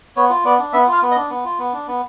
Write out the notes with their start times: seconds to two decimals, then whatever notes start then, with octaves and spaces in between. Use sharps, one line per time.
0.16 B3 C#5
0.30 F4
0.45 B3 D5
0.59 D4
0.73 B3 E5
0.87 F4 F5
1.02 B3
1.11 D#5
1.16 D4
1.30 B3
1.45 F4
1.59 B3
1.73 D4
1.87 B3